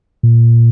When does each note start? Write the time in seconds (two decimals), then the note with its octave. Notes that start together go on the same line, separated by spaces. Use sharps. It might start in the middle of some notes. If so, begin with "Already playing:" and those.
0.23 A#2